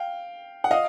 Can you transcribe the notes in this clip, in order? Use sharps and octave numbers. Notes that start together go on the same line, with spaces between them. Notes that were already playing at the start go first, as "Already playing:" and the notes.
Already playing: F5 G5
F#5
D#5 F5